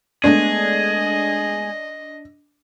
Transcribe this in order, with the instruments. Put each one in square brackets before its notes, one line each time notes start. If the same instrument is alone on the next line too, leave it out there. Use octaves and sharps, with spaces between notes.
[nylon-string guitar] G#3 A3 B3 [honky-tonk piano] D4 [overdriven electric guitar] G#4 [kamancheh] D#5